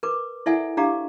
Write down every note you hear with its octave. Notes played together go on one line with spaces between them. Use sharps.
A#4 B4 D6
E4 A4 D5 E5 F#5 G#5
D4 G4 D5 F5 A#5 D6